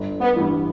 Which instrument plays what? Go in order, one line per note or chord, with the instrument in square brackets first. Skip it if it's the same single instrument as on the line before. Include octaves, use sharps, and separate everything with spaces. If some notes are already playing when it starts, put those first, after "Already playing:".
Already playing: [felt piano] G1
[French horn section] B3
[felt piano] G2 E3